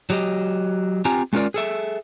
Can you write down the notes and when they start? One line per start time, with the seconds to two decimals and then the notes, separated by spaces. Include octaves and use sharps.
0.10 F#3 G4 D#5
1.05 C4 F4 G4 G#5 A#5
1.33 G#3 A3 C#4 F4 A#4 D5
1.54 G#4 A4 E5